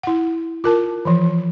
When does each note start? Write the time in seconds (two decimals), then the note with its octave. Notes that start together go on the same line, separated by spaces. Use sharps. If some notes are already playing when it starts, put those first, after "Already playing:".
0.03 E4 F#5
0.64 F4 A#4 A5
1.05 E3 F3